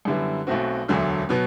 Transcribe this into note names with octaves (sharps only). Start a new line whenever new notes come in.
F#2 D3 G3 B3 E4
B1 B2 A3 C4 F#4
E1 D2 D3 F#3 A3
B2 F#3 B3